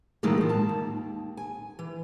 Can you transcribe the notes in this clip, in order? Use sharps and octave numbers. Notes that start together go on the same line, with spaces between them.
A2 D#3 E3 F#3 G#3 A#3
D#3 F4
G#2 A5
D#2
G#5
E3